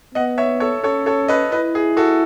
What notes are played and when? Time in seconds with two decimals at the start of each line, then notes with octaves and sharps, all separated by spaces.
0.15 B3 D#5 F#5
0.38 C#5 E5
0.60 A4 C#5
0.84 C#4 A4 C#5
1.06 A4 C#5
1.28 B4 D#5
1.52 E4 B4 D#5
1.75 G#4
1.97 F#4 A4